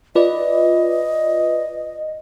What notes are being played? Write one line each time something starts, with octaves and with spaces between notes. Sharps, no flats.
F4 B4 D5 D#5